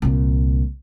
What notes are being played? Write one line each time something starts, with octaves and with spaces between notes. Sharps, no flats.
C2 A#2